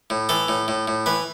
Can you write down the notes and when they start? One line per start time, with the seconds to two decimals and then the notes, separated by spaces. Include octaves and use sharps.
0.10 A2
0.29 E3 A4
0.48 A2
0.68 A2
0.88 A2
1.06 E3 B4